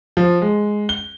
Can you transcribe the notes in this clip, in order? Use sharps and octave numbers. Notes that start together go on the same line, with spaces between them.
F3
G#3
G7